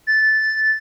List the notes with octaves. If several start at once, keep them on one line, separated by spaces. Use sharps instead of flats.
A6